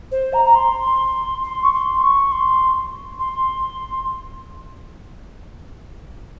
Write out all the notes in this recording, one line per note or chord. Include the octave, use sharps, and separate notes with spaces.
C5
A#5
A#5
C6
C6
C#6
C6
C#6
C6
C6